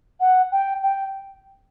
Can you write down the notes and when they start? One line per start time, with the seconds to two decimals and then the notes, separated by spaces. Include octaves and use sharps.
0.20 F#5
0.52 G5
0.83 G5